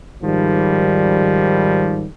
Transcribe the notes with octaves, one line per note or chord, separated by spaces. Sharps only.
G#2 D#3 F3 G3